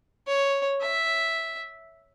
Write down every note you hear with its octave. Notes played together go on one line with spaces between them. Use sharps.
C#5
E5